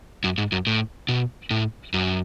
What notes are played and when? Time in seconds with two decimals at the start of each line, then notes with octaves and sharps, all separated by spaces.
0.24 F#2
0.38 G#2
0.52 F#2
0.67 A2
1.09 B2
1.51 A2
1.94 F#2